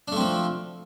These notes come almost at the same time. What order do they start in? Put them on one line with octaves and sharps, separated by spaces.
D4 A3 C4 F3